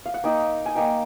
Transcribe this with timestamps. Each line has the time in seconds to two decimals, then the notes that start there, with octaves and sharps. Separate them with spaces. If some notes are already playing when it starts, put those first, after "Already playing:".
0.06 F5
0.14 F#5
0.24 A#3 D#4 G5
0.66 G#5
0.75 A#3 D#4 G5